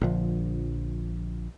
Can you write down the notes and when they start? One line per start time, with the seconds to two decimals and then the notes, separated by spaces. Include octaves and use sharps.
0.01 A#1 D3 F3